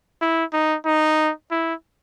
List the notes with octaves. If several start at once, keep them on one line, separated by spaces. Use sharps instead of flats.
E4
D#4
D#4
E4